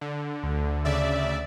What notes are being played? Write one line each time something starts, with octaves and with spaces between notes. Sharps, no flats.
D3
D2
C#3 D5 E5